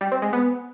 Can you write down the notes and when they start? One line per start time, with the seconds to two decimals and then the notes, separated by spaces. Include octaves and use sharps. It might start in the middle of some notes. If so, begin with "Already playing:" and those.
0.01 G3
0.12 C4
0.22 G#3
0.33 B3